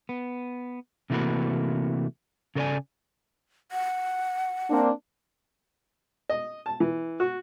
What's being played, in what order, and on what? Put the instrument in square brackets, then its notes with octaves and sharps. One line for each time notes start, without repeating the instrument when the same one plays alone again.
[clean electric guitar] B3
C3 E3 A3 A#3 F#4 B4
C#3 A4 A#4 C#5 D5 G#5
[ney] F#5
[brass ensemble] A#3 C4 D4
[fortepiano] D#5
A5
E3
F#4